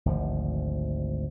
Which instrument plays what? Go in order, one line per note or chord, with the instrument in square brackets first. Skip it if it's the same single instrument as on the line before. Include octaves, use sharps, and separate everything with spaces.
[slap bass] G#1 D2 F3